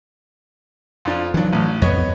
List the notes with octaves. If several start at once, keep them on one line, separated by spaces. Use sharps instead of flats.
F2 D4 F4
D#3 E3 F#3 D4
A1 A2
F2 B3 C#5 D#5